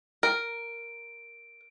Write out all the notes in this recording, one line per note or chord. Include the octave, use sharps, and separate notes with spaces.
A#4 D7